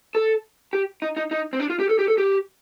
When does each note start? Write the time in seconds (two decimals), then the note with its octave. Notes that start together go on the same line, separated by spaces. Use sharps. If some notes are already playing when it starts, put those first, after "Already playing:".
0.15 A4
0.73 G4
1.02 D#4
1.17 D#4
1.31 D#4
1.53 C4
1.60 D4
1.70 F4
1.80 G4
1.89 A4
1.99 G4
2.08 A4
2.18 G4